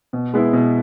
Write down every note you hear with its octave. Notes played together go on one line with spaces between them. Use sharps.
B2
G#3 B3 E4
B2